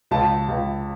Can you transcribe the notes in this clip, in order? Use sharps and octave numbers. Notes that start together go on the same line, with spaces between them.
C#2 A5
C#2